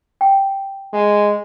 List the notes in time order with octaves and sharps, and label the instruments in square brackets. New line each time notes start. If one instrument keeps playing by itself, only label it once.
[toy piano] G5
[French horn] G#3